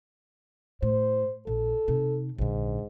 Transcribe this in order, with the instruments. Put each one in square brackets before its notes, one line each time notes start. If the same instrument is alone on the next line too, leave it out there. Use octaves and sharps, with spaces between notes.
[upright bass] A2 [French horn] C5
[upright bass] A#1 [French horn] A4
[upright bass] C3 D#4
[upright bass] A#1 D3 [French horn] G#2